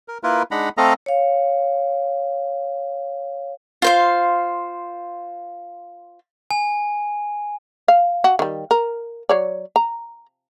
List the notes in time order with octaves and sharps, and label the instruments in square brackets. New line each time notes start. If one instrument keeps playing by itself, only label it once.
[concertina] A#4
A#3 E4 F4 A#4 B4
G#3 D4 D#4 F#5 A#5 B5
A3 C4 A4 D#5 F5 A#5
[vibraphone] C#5 F5
[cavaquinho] F4 C5 F5
[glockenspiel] G#5
[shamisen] F5
F#4
D#3 G3
A#4
F#3 C#5 D5
A#5